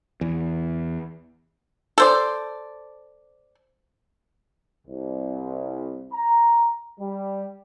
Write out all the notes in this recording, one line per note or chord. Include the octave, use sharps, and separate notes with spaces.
E2
A4 C5 D5
C2
A#5
G3